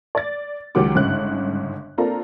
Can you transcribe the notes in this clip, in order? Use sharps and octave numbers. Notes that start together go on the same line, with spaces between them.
D5 A6
C#2 D#3 F#3 G4 F#5 D6
G1 G#2 C#3 F#6
A#3 C4 D4 F4 A4 A#5